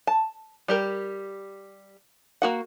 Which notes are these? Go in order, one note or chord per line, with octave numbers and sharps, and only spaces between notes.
A5
G3 G4 A#4
A#3 F#4 F#5